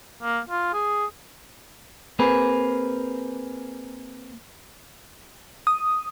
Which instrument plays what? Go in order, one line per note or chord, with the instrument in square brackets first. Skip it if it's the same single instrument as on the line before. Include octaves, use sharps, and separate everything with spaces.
[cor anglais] A#3
F4
G#4
[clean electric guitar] A#3 C4 G#4 B4
[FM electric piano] D#6